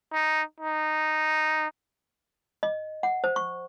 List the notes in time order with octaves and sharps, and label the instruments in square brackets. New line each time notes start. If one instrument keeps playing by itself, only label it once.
[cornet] D#4
D#4
[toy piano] D#5
F#5
C5
C#6